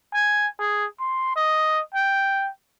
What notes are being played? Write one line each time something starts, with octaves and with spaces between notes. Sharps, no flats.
G#5
G#4
C6
D#5
G5